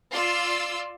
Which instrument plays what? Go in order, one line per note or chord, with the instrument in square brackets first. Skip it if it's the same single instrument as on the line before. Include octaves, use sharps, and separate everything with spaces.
[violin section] F4 D5 C6 E6